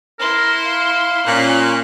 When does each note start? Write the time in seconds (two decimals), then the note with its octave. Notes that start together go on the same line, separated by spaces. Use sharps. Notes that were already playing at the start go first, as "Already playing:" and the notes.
0.20 E4 A#4 C6
0.66 F5
1.26 A#2 C#4 F#6